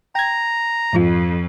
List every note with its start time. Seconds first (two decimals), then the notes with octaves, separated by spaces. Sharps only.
0.15 G5 A#5 G#6
0.93 F2 G#2 F3 F4